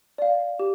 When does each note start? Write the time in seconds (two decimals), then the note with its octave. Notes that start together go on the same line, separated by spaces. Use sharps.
0.18 D5 F5
0.59 G4